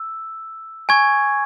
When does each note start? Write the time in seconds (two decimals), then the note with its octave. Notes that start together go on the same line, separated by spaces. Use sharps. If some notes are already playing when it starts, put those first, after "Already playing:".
Already playing: E6
0.89 G#5 C#6 G#6